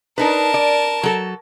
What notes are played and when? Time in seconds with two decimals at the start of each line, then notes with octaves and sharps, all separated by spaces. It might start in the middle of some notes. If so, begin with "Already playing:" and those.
0.18 D4 D#4 A#4 B4 A5
0.54 D5
1.03 F#3 A4